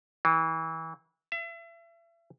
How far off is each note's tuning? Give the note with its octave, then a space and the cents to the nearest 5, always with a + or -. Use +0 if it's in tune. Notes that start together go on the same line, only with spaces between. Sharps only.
E3 -30
E5 +35